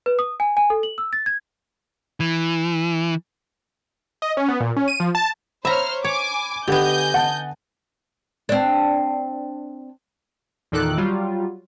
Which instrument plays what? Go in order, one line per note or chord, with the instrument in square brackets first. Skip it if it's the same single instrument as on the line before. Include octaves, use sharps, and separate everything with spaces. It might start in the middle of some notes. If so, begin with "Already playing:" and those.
[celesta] B4
D#6
G#5
G#5
A4
F#7
E6
A6
G#6
[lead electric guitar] E3
[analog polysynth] D#5
C#4
B3
A#2
C#4
D#7
F3
A5
[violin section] C5 C#5 F6 [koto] E5 A#5 [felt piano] B5
[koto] C#5 [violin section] G#5 D6
[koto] D3 B3 [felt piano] G4 [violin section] D#5 G#5 G6
[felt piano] F#5 A5
[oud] C4 D4
[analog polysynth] E2 A#2 D#3 A4 D6 F#6
F#3 G3 F4